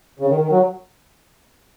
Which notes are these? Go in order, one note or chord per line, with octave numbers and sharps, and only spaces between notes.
C#3
D#3
D#3
F#3